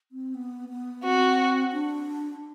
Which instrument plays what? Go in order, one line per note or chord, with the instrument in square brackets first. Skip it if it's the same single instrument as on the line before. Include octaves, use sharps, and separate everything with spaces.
[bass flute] C4
B3
B3
[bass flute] C4 [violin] F#4
[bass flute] D4